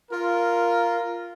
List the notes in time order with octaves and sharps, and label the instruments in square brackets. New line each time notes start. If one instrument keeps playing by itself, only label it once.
[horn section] F4 A#4